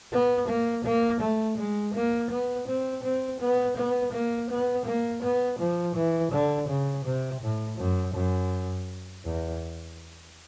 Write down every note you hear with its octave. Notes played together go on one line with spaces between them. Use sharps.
B3
A#3
A#3
A3
G#3
A#3
B3
C4
C4
B3
B3
A#3
B3
A#3
B3
F3
E3
D3
C#3
C3
A2
F#2
F#2
E2